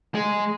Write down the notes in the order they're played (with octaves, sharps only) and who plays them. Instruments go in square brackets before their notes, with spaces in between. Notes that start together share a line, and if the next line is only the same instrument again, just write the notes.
[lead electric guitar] G#3